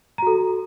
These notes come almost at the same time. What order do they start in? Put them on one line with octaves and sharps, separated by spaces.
A#5 F#4 A4